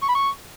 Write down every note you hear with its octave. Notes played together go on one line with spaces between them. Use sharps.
C#6
B5
C#6